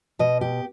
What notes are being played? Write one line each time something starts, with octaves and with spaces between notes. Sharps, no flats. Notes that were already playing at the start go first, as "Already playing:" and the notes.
B2 D#5
G4